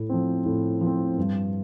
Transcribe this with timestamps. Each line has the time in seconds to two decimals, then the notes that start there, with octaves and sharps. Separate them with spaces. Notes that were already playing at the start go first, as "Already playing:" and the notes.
Already playing: A2
0.10 F3 C4
0.45 A2
0.81 F3
0.86 C4
1.18 G2